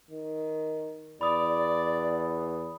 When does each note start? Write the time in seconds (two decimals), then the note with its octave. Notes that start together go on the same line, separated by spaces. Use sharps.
0.11 D#3
1.21 E2 D5 B5 D#6